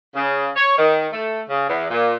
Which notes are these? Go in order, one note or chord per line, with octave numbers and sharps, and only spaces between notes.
C#3
C#5
D#3
A3
C#3
E2
A#2